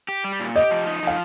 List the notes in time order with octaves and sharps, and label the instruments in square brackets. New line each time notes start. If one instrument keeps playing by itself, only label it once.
[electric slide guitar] G4
G3
A#2
[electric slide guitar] G4 [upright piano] D#5
[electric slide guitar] F3
D#4
[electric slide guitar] F3 [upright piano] F5